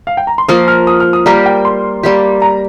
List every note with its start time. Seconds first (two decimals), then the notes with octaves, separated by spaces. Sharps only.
0.07 F5
0.17 G5
0.27 A#5
0.38 C6
0.48 F3 A#3 F4 A#4 D#6
0.68 F6
0.87 D#6
1.00 F6
1.13 D#6
1.26 G3 A#3 G4 A#4 A#5
1.46 G5
1.65 C6
2.03 G3 A#3 G4
2.42 A#5